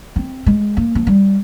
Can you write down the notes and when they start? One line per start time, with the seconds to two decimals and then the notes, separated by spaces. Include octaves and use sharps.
0.16 C4
0.46 G#3
0.77 A#3
0.95 F3
1.07 G3